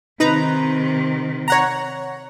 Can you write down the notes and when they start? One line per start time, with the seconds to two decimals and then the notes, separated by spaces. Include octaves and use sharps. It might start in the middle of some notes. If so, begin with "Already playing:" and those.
0.20 C3 D#3 D#4 B4 A#5
1.48 C#5 F#5 A#5